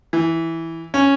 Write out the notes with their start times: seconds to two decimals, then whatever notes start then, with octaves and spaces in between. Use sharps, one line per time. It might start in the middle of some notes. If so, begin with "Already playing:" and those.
0.13 E3
0.94 C#4